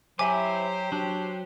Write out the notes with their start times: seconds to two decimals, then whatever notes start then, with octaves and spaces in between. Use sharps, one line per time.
0.19 F#3 E4 G4 C5 E5 G#5 D6
0.92 F#3 D4